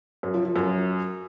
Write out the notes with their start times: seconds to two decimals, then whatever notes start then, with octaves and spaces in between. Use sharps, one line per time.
0.23 F#2
0.34 F3
0.45 F3
0.56 F#2